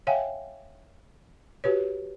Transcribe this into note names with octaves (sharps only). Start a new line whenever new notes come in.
C#5 E5 F5 G5 G#5
F#4 G4 B4 C#5